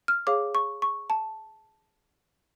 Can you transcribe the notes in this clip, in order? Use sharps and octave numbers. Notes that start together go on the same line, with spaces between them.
F6
G#4 C#5 F5 D6
C#6
C#6
A5